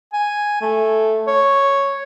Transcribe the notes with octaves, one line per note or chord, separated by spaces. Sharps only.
G#5
A3
C#5